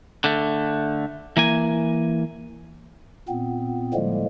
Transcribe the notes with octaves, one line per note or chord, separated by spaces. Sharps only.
D3 A3
E3 A#3 G#5
A#2 B3 C4
A2 D3 F3 G3 G#3 A#3